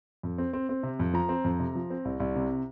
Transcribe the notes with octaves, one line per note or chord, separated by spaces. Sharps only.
F2
C4
C4
C4
C3
F2
F3 A#5
C4
F2
C3
F3
C4
C2
C2
C3